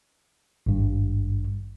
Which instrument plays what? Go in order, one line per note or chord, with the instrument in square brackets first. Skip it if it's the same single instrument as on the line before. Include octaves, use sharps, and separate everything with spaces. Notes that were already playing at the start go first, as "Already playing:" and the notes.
[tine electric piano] G#1 G2